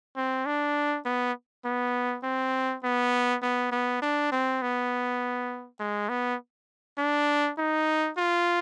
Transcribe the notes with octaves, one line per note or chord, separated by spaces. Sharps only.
C4
D4
B3
B3
C4
B3
B3
B3
D4
C4
B3
G#3
B3
D4
D#4
F4